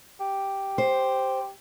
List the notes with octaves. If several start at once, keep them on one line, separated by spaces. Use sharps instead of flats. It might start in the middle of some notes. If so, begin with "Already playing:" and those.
G4
C5